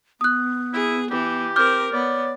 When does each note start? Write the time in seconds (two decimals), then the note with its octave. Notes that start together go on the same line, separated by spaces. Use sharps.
0.21 B3 D#6 F#6
0.73 E4 G#4
1.11 E3 G4
1.56 C4 A#4 D6 F6 G6
1.93 B3 C#5 D5